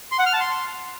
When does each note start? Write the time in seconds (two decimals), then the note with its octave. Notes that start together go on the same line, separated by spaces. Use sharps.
0.12 C6
0.19 F#5
0.26 F6
0.33 A5
0.40 C6